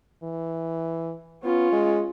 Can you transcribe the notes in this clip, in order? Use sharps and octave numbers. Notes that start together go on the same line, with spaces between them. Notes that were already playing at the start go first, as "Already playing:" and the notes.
E3
B3 C#4 F4
G#3